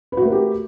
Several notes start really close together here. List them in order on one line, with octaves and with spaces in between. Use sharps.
B4 F#4 A3 A#4 G4